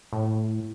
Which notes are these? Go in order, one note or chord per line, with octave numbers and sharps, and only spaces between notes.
A2